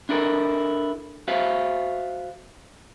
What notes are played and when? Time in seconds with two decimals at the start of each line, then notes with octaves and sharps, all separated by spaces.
0.09 D4 E4 A4 A#4
1.28 F#4 C5 E5 F5